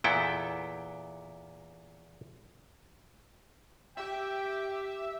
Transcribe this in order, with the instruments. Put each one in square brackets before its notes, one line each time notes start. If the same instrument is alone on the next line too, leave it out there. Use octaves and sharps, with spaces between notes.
[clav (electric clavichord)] E2 A#2 B3 E4 A4 G5
[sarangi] G4 [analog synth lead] E5 [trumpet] G5